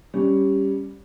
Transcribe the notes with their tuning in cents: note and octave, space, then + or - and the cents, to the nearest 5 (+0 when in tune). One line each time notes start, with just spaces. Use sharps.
G3 +0 C#4 +0